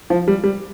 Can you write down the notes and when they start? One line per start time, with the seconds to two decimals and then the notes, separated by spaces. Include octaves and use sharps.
0.10 F3
0.28 G3
0.44 G3